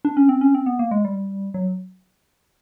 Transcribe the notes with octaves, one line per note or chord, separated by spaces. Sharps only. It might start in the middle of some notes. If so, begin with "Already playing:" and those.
D4
C#4
C4
C#4
C4
B3
A#3
G#3
G3
F#3